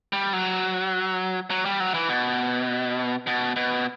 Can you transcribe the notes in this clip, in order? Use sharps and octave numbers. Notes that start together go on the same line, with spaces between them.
G3
F#3
F#3
G3
F#3
E3
B2
B2
B2